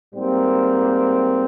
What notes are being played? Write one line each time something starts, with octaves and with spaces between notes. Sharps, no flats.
G#2 G3 A#3 C4